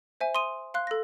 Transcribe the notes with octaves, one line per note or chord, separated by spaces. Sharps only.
C5 E5 G#5
C6 D#6 D#7
F5 C6 F#6
A4 A#6